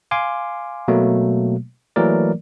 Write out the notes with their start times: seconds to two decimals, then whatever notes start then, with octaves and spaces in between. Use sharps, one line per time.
0.11 F5 G#5 C6 D6
0.88 B2 F#3 A3 A#3
1.96 E3 F#3 A3 A#3 A#4 D5